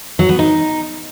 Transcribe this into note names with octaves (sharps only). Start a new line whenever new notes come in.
F#3
B3
D#4